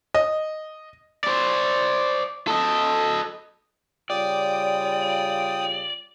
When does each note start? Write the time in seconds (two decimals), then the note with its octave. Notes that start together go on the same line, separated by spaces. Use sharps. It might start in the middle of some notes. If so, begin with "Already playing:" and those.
0.15 D#5
1.24 C5 D5
2.47 A4 D#5
4.10 C#3 G3 F4 D5 G5 D#6